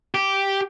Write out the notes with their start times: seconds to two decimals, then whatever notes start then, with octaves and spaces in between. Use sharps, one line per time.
0.14 G4